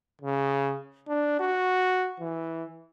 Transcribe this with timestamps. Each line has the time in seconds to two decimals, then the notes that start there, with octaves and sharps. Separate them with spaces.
0.22 C#3
1.08 D4
1.40 F#4
2.20 E3